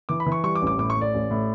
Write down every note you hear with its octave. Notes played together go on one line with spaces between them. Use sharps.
E3 D6
B5
E3
C#6
G3 C#6
D6
A1
D6
A2 D6
C#6
A2
D5
A1
A2